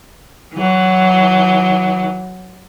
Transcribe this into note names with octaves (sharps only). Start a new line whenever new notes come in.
E3 F#3